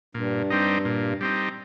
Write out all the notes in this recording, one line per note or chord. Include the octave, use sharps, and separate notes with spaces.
G2 A#2
G3 C4 D#4
A#2
G3 C4 D#4